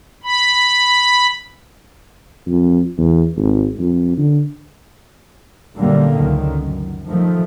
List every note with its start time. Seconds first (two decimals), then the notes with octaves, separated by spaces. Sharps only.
0.24 B5
2.46 F2
2.98 E2
3.37 G#1
3.79 F2
4.18 D3
5.76 F#2 A#2 D3 G3 A3 A#3
6.16 C#2 F#2 D3 D#3
6.62 F#2
7.07 D#3 F3 A3